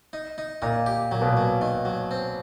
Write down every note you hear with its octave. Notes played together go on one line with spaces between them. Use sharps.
D#4
D#4
A#2 D#4
G4
A#2 F#3
B2
A#2 F#3
D#3
F#3
C4